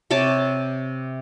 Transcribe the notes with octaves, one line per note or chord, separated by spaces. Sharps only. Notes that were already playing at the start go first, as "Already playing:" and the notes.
C3 C#5 A5 D6